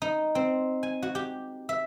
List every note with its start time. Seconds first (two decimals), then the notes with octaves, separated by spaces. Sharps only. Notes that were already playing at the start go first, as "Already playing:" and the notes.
0.02 D#4
0.35 C4
0.83 G#5
1.02 F#4
1.15 G4
1.69 E5